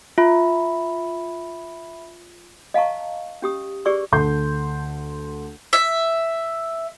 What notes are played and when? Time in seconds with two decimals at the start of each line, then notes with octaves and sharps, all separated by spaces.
0.18 F4 E5 B5
2.74 D#5 F5 A5 A#5 C#6
3.42 C#4 G4 D#6
3.85 G4 G#4 B4 D5 C#6 E6
4.12 D2 A4 C6 G6
5.73 E5